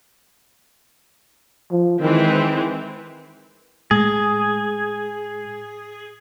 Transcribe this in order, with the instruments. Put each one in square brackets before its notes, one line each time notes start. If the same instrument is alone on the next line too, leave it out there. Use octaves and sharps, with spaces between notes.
[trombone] F3
[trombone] D#3 [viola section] E3 G#3 C4
[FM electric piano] A2 G#3 [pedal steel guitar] G#4